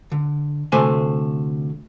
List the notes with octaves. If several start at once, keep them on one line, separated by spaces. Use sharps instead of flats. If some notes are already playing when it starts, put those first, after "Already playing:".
D3
D2 C3 A3 C5 G#5